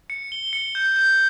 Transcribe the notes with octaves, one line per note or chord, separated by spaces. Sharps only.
C#7
G7
C#7
G6
G6